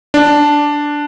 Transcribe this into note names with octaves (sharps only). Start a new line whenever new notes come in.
D4